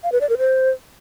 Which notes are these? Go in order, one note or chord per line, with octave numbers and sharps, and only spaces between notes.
F5
B4
D5
A#4
C5